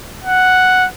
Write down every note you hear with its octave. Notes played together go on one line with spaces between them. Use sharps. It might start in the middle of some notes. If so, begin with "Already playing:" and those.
F#5